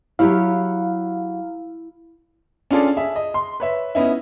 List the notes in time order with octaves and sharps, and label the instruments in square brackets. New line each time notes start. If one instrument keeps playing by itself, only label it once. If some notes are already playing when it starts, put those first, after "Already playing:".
[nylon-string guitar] F#3 G4 C#5 [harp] E4 [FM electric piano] F5
[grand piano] C#4 D4 F4 G#4 A4 D5
G#4 E5
D#5
C6
B4 C#5 E5
B3 C#4 D#4 E4